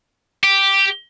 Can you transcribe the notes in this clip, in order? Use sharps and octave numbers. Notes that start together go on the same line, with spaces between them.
G4